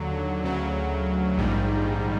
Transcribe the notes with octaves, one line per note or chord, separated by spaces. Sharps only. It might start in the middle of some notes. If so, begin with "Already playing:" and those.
Already playing: D#2 D3 F#3
D2 C#3 F#3
A#1 G#2 D#3 G3